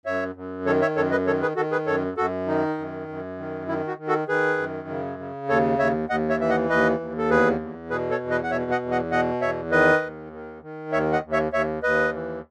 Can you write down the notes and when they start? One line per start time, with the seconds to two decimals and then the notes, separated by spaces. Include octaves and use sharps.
0.06 F#2 C#5 E5
0.35 F#2
0.66 D#3 A4 C#5
0.82 C#5 E5
0.96 F#2 A4 C#5
1.11 B4 D#5
1.27 D#3 A4 C#5
1.42 G#4 B4
1.56 D#3 F#4 A4
1.71 G#4 B4
1.87 F#2 A4 C#5
2.17 F#2 F#4 A4
2.47 D#3 D#4
2.78 F#2
3.08 F#2
3.38 D#3
3.68 D#3 E4
3.88 D#4 F#4
3.98 D#3
4.08 F#4 A4
4.28 D#3 G#4 B4
4.58 F#2
4.88 C#3
5.19 C#3
5.49 D#2 A4 C#5
5.79 D#2 C#5 E5
6.09 D#2 D#5 F#5
6.29 C#5 E5
6.39 E3 E5
6.49 D#5 F#5
6.69 D#2 B4 D#5
7.00 D#2
7.18 A4
7.30 E2 G#4 B4
7.61 E2
7.90 B2 G#4 B4
8.10 A4 C#5
8.21 E2
8.31 B4 D#5
8.43 F#5
8.51 B2 C#5 E5
8.71 D#5 F#5
8.81 E2
8.91 D#5 F#5
9.11 B2 D#5 F#5
9.41 E2 C#5 E5
9.72 D#3 B4 D#5
10.02 D#2
10.33 D#3
10.62 D#3
10.92 D#2 C#5 E5
11.13 D#5 F#5
11.23 D#2
11.32 C#5 E5
11.52 D#2 C#5 E5
11.83 D#2 B4 D#5
12.13 E3